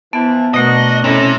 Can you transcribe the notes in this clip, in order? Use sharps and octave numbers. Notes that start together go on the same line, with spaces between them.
E3 F3 B3 A5
B2 A3 D4 F#4 A#4 D#5
C3 C#4 E4 A4 A#6